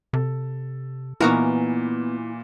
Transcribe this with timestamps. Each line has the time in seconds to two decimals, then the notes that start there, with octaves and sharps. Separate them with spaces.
0.13 C3 A4
1.20 A#2 E3 B3 D#4 E4 F#4 A#4